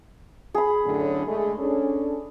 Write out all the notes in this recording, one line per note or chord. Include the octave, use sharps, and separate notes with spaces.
G#4 B5
F#2 A2 D3
G#3 A3
C#4 D4 A4